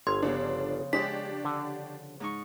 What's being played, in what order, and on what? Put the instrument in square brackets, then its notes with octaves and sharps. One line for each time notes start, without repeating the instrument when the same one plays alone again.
[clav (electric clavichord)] G1 [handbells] C6 [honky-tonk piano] G#6
[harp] C#3 F3 B3 [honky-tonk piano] D4
[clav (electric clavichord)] G#3 [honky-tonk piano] D4 G4 C#5 [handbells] B6
[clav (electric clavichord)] D3
[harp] G#2 D#4 C#6